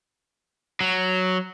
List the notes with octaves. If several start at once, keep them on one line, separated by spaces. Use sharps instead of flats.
F#3